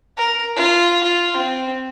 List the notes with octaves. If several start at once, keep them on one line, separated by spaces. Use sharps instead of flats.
A#4
F4
F4
C4